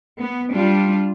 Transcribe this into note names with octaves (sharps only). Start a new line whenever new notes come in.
B3
G3 D4 F4